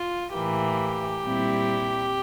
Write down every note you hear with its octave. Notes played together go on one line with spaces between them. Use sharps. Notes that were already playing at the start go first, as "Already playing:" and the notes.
Already playing: F4
A2 E3 A#3 G4
A#2 G3 C4 E4